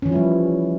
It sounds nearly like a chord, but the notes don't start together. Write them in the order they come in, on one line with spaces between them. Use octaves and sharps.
C#4 E3 F3 E4 G3